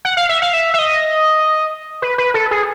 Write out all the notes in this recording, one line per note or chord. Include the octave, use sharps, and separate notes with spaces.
F#5
F5
E5
F5
E5
E5
D#5
B4
B4
A4
G#4